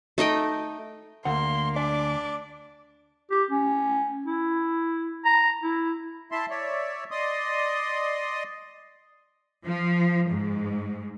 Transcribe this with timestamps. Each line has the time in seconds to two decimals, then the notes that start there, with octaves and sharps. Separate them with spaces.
0.18 A3 D#4 D#5 G5
1.25 D2 A#3 F#5 C6
1.76 D4 D5 D6
3.31 G4
3.51 C#4
4.26 E4
5.25 A#5
5.62 E4
6.32 E4 E5 A5 C6
6.50 C#5 D5 E5
7.11 D5 D#5 C6 D#6
9.65 F3
10.30 G#2